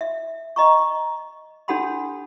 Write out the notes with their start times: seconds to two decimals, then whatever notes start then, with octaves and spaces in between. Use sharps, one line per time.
0.01 E5
0.56 D#5 A#5 C#6
1.68 D4 G4 A4 F#5 B5 C6